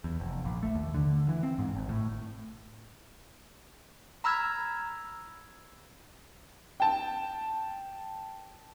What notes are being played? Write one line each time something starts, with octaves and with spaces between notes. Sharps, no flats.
E2
F1
A#1
A3
D#2
D3
E3
C4
G#2
G#1
A2
A#5 B5 E6 F6 G#6
G5 A5